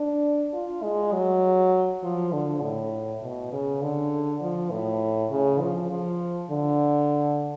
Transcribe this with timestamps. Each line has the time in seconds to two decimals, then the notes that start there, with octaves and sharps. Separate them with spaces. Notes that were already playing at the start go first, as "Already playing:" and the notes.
Already playing: D4
0.54 F4
0.83 G#3
1.13 F#3
2.03 F3
2.32 D3
2.62 A2
3.22 B2
3.52 C#3
3.82 D3
4.41 F3
4.71 A2
5.31 C#3
5.61 F3
5.91 F3
6.50 D3